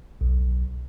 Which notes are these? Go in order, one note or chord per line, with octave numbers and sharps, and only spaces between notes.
B1